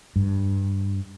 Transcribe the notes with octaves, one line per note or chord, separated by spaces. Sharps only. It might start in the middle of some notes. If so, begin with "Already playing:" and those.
G2